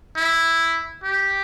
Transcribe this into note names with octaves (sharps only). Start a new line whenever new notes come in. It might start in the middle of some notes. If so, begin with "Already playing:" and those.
E4
G4